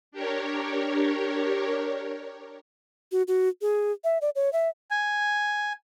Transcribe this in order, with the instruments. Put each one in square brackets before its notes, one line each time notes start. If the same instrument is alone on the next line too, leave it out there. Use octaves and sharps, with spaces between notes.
[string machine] D4 G4 A#4 C#5
[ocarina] F#4
F#4
G#4
E5
D5
C#5
E5
[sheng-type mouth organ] G#5